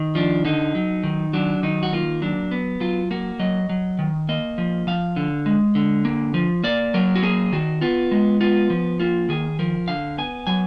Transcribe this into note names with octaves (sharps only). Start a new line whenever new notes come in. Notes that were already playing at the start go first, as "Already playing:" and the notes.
Already playing: D#3
F3 D4
D3 D#4
F#3
D#3
F#3 D4
D#3 D#4
F#4
A#3 F4
F#3 D4
B3
F#3 F4
A#3 F#4
F#3 D#5
F#3
D#3
A#3 D#5
F3
F3 F5
D3
G#3
D3
A#3
F3
A#3 D5
F#3 A#4
F#4
A#3 G#4
D#3 F#4
B3 F4
G#3
B3 F4
F3
A#3 F4
D#3 G#4
F3 A#4
D3 F5
B3 G#5
F#3 G#5